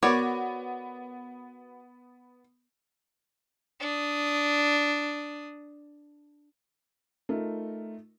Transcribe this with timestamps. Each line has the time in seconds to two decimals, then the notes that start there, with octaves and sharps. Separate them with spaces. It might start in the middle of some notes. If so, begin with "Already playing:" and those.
0.03 B3 F#4 A#4 C#5 D5 B5 D6
3.80 D4 D#6
7.29 A3 D#4 F4 A#4